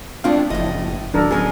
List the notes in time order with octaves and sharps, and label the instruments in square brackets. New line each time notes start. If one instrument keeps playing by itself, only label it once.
[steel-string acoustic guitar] G#3 A3 C4 [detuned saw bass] D4 [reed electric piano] F4 F5
[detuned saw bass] F#1 [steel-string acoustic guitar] A2 D#5 [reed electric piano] F3 E4
[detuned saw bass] D1 [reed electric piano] D#3 F#3 [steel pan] D4 A4 A#4
[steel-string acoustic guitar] B3 C#4 [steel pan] G#4 A#4